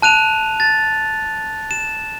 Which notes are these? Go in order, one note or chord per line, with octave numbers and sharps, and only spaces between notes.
A5 F#6 D#7 F7
A6
E7